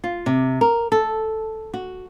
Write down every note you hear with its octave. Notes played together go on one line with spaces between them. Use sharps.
F4
C3
A#4
A4
F#4